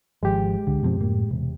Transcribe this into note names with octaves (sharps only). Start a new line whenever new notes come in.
G#1 F3 G#3 G4
C#2 D3
F#2 B2 F3 C4
A2 A#3
E1 C3